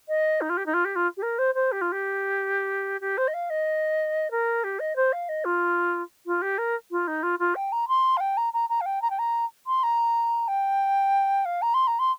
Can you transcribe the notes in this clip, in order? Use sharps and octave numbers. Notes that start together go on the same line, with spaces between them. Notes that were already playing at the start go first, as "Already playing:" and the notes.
D#5
D#4
F4
G4
D#4
F4
G4
F4
G4
A#4
C5
C5
G4
F4
G4
G4
C5
D#5
F5
D#5
A#4
G4
D#5
C5
F5
D#5
F4
F4
G4
A#4
F4
D#4
F4
F4
G5
A#5
C6
F5
G5
A#5
A#5
A#5
F5
G5
A#5
G5
A#5
C6
A#5
G5
F5
A#5
C6
A#5
C6